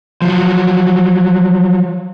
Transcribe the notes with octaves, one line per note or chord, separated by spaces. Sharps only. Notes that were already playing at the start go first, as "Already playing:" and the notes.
F3 F#3